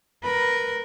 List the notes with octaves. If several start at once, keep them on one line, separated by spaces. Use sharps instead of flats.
A#4 B4